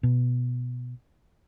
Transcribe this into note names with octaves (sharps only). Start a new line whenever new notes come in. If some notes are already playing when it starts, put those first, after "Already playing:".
B2